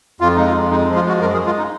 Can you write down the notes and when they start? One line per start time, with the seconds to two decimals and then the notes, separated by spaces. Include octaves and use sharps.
0.21 F2 F4
0.36 G#3 D#4
0.46 F4
0.54 F2
0.71 G#3 D#4
0.88 F3
0.96 F4
1.04 G#3 F#4
1.21 F#2 A#4
1.33 G#4
1.37 G#3
1.46 F4
1.58 D#4